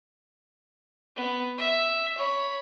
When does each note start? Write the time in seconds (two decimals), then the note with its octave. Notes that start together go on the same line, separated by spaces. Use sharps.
1.16 B3
1.58 E5
2.17 C#5 B5